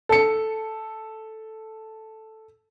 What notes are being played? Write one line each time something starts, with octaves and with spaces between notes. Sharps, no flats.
A4 C#7